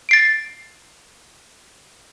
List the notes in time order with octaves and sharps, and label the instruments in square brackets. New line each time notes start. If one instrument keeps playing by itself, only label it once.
[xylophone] A6 C7 D7